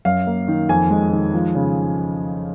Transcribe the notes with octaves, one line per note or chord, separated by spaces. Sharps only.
F#2 F5
A#3
D#3
F2 G#5
G#3
D#3
F3
C#3